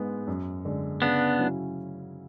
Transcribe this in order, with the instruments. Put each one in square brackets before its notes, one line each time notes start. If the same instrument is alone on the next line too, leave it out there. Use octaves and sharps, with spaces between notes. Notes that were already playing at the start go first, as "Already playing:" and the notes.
Already playing: [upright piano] G#2 G#3 B3
F#2
D3 G#3
[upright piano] C#3 [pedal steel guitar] B3 D4
[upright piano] F#3 C#4 E4